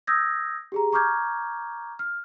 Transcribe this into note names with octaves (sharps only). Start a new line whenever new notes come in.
D#6 E6 G6 G#6 A#6
G4 G#4 A#5
A#5 C#6 D6 F6 G6 G#6
F6